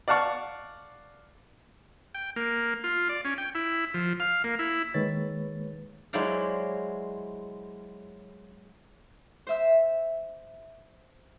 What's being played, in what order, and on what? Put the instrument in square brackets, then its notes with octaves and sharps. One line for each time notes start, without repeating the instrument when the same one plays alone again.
[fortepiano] D5 F5 F#5 A5 C#6
[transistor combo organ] G5
A#3
F4
D5
C#4
G5
E4
F3
F5
A#3
E4
[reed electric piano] D#3 G#3 A#3 B4 C#5 A6
[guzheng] F#3 G#3 E4 C5 D5 F5
[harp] C5 E5 E6